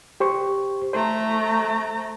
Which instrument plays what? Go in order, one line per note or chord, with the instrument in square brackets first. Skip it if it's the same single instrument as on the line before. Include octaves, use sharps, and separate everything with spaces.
[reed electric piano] G4 C5 C#6
[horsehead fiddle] A3 A#5 [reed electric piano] C5